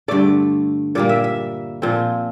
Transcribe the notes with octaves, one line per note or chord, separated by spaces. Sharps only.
G2 D3 A3 D5
A#2 G3 A#3 D5
E5
E5
A#2 F3 C4